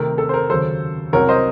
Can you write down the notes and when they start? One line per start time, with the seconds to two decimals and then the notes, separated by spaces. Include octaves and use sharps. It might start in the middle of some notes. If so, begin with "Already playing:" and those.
Already playing: C3 D#3 A3 C4 A#4
0.18 A4
0.29 C5
0.34 A#4
0.50 D#2 C#3 F#3 A4 C5
1.13 C2 C3 F#3 C4 A#4 C#5
1.29 C5 D#5